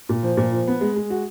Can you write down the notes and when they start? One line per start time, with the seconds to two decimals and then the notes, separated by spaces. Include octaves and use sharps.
0.09 A#2
0.23 F3
0.37 A#2
0.52 F3
0.67 B3
0.81 G#3
0.96 G#3
1.10 F#4